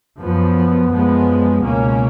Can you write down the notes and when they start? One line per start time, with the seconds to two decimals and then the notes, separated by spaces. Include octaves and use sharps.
0.18 F#2 F3 B3
0.90 F#2 F3 G#3 B3
1.61 C#2 B2 A#3 C#4